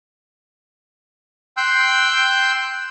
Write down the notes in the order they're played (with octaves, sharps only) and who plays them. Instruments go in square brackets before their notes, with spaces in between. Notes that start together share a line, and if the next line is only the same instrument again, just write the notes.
[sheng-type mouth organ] G5 C6 E6 F#6 G6